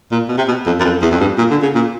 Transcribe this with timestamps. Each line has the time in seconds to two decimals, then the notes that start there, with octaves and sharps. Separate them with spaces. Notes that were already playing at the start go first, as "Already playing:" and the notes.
0.12 A#2
0.29 B2
0.38 C3
0.48 B2
0.66 F2
0.80 F#2
0.84 F2
1.02 E2
1.11 F2
1.20 G2
1.38 A#2
1.51 D3
1.62 C#3
1.75 A#2